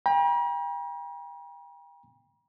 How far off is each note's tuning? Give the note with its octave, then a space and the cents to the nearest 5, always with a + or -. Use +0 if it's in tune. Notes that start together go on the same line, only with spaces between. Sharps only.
G5 +35 A#5 +45